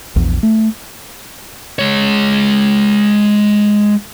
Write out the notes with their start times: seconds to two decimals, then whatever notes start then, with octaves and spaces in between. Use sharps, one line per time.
0.16 A#1 E2
0.43 A3
1.79 G#3 C#5